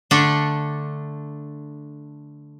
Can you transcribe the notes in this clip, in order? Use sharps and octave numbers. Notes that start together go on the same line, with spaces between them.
D3 A3 D4 A4